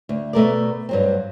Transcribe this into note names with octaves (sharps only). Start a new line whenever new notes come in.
D2
B2 A3 A#4 D5
G2 F#3 C4